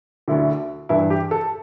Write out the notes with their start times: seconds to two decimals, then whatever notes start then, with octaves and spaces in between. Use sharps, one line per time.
0.28 D2 D3 E4
0.89 G2 E3 E4
1.10 G4
1.31 A4